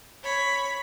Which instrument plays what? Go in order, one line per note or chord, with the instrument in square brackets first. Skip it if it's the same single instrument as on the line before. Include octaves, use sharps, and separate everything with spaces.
[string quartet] C#5 B5